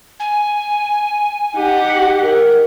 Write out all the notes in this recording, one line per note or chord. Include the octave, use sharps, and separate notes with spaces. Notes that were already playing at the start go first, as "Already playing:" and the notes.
G#5
D#4 G4 F#5
A#4